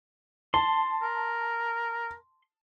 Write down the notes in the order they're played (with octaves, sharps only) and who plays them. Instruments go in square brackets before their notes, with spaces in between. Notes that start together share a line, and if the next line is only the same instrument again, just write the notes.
[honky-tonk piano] A5 [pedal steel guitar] C6
[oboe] A#4